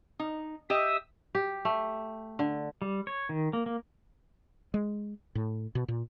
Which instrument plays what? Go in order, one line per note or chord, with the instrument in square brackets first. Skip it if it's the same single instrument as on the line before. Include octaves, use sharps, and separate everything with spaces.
[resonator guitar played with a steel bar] D#4
[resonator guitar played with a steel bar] G4 D#5 [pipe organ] E5 D#6 E6
[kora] G4
A3
D3
[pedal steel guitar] G3
C#5
D#3
A#3
A#3
[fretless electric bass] G#3
A2
B2
A#2